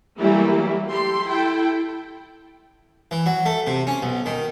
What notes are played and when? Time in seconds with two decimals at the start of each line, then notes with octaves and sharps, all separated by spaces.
0.18 E3 F#3 G3 A3 A#3 E4
0.88 G4 A4 C6
1.25 E4 A4 G5
3.11 E3
3.26 F#3
3.46 A3
3.67 C3
3.87 C#4
4.02 B1
4.26 D#3